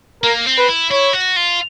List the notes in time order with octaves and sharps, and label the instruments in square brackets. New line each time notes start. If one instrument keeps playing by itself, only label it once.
[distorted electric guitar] A#3 [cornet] A#4
[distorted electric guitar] C4
[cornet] B4
[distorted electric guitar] E4
[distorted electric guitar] E4 [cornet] C#5
[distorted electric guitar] F#4
F4